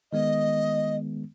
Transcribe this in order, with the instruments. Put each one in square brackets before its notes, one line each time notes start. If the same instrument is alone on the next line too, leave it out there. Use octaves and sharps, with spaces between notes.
[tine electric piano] D#3 G#3 B3 [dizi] D#5